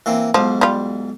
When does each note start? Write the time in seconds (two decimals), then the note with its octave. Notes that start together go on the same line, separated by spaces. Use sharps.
0.06 E3 A#3 C4
0.34 B1 G#2 F3
0.61 G3 F4